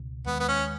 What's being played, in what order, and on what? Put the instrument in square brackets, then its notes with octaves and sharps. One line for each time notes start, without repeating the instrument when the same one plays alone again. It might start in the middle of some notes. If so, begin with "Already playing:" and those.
Already playing: [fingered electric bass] C#2 B2
[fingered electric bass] D#2 D#3 G#3 [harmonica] B3
[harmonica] B3
C#4